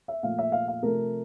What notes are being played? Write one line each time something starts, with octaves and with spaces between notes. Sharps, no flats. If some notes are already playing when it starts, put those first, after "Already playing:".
E5
A#2 F3 A3 F5
E5
F5
F5
C3 F3 A3 A#4